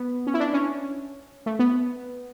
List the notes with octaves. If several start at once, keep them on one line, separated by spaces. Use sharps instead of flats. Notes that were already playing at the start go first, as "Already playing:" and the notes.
Already playing: B3
C#4
E4
D4
C#4
A3
B3